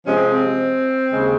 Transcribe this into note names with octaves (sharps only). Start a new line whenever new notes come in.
C3 F3 G#3 C#4
C4
C4
D#2 C#3 G#3